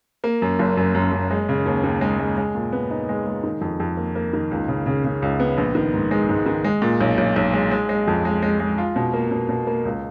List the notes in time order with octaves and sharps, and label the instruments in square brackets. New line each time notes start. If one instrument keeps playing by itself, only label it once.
[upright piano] A#3
F#2
F#1
F#2
F#2
F#2
G#3
C#3
D#2
D#2
G#3
G#3
G#3
A#2
B3
D#4
G#3
G#3
D#3
F2
F2
A#3
A#3
D#3
C#2
C#3
C#3
C#3
C#2
B3
A#1
D#3
G#2
G#3
G#2
D#3
G#3
A#2
B1
B1
B1
G#3
G#3
G#3
F2
G#3
G#3
G#3
F4
B2
A#3
B2
B2
A#3
C#2